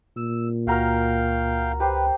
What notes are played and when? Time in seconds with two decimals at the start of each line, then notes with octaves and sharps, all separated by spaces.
0.17 A#2 E6
0.67 C#2 F#4 A#4 F5 G5
1.80 G4 B4 C5